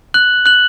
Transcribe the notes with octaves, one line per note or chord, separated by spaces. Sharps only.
F#6 F#7
F#6 F#7